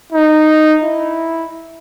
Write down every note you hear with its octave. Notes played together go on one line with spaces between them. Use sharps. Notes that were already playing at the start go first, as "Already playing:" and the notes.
D#4
E4